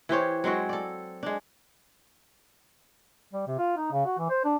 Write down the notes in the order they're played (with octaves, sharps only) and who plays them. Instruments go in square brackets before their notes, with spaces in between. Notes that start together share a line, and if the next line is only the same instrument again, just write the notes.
[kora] E3 G4 C5 C#5
F#3 G#3 C4 F#4
A4 D5
G#3 D4
[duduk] G3
C3
F4
D#4
C#3
F#4
E3
C5
D4